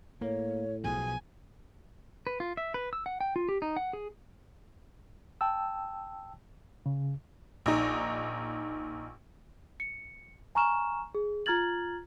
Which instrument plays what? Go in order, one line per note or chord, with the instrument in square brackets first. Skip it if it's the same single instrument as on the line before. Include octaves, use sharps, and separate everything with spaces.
[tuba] A2 [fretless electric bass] A#3 [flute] C#5
[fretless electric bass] B1 B2 F3 [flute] G#4 [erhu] G#5
[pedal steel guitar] B4
F4
E5
B4
E6
F#5
G5
F4
G4
D#4
F#5
G#4
[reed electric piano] G5 A5 E6
C#3
[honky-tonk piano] A#1 D#4
[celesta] C#7
G#5 A#5 C#6 F6 E7
G#4
F4 A#5 F6 G#6 A6 F#7